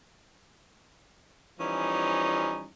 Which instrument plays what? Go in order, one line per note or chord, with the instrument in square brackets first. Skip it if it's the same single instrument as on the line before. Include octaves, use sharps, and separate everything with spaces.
[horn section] E3 F3 G3 C#4 D#4